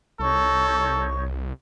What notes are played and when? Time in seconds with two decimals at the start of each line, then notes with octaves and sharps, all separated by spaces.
0.19 C2 D#4 A4 C#5 C#6